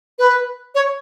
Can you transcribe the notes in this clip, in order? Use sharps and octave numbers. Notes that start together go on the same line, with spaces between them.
B4
C#5